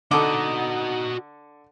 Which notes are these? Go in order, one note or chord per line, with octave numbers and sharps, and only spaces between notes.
D3 D#4 F#4 A4 D#5 D6